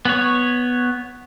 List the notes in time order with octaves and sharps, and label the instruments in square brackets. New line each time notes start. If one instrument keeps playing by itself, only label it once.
[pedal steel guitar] B3 C#5